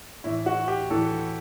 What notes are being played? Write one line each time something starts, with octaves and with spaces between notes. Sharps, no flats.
A2 E3 E4
F#4
G4
A2 E3 A4